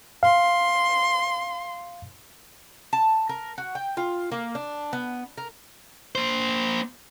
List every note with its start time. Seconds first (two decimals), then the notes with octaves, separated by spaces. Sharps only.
0.23 F5 C6
2.93 A5
3.29 A#4
3.58 F#4
3.75 G5
3.97 F4
4.32 A#3
4.55 D4
4.93 B3
5.38 A#4
6.15 A#3 C5